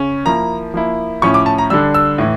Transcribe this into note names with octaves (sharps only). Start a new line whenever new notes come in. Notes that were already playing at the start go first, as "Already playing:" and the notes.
Already playing: C#3 C#4
F3 A#3 E4 A#5
F3 A#3 E4
A2 F3 C#4 E4 C#6
D6
A5
A#5
D3 G3 D4 E6
E6
A2 E3